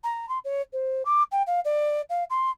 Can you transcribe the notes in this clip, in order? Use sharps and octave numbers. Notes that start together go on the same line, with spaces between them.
A#5
C6
C#5
C5
D6
G5
F5
D5
F5
C6